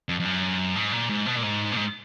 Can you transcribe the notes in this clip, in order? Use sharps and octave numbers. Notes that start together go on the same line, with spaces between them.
F2
F2
F#2
G#2
A#2
G#2
B2
A#2
G#2
A#2
G#2